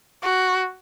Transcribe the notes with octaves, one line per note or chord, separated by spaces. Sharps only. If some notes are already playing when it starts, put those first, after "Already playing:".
F#4